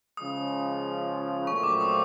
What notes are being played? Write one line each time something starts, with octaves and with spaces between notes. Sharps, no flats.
C#3 F3 G#3 D#6
A#2 F#3 A3 C4 F4 C#6
D6
D#6